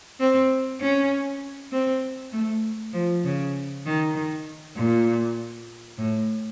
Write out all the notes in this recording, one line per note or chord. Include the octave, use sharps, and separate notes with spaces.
C4
C#4
C4
A3
F3
C#3
D#3
D#3
A#2
A2